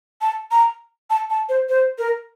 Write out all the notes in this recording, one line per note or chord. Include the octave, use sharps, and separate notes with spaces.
A5
A#5
A5
A5
C5
C5
A#4